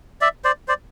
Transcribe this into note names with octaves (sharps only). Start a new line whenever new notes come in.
D5 E5
C5 D5
C5 D5